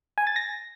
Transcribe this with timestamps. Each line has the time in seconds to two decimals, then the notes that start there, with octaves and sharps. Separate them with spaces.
0.18 G#5
0.27 A6
0.36 A#6